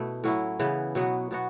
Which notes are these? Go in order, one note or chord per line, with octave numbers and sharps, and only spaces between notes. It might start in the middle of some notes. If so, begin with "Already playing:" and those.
Already playing: B2 A3 B3 E4
A2 F#3 C#4 E4
C#3 E3 B3
B2 F#3 B3 F#4
B2 B3 F#4